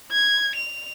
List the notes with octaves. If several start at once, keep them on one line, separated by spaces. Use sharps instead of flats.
G#6
F7